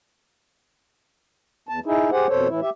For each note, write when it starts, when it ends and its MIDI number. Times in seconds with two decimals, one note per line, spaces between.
1.69 1.80 40
1.69 1.80 81
1.86 2.10 63
1.86 2.10 64
1.86 2.10 68
2.12 2.27 67
2.12 2.27 68
2.12 2.27 72
2.12 2.27 78
2.29 2.48 41
2.29 2.48 47
2.29 2.48 69
2.29 2.48 72
2.29 2.48 73
2.48 2.60 45
2.48 2.60 52
2.48 2.60 64
2.62 2.70 67
2.62 2.70 76